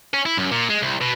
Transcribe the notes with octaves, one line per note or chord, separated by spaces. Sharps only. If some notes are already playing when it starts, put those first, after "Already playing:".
C#4
E4
F#2
A#2
G#3
C2
B2